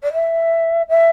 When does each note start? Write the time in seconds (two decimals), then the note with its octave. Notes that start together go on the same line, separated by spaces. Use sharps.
0.03 D5
0.13 E5
0.89 E5